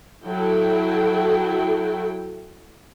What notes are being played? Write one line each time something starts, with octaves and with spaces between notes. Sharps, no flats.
F#3 E4 A4 G5